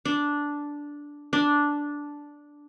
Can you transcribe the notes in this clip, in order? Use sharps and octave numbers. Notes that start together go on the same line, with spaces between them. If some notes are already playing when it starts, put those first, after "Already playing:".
D4
D4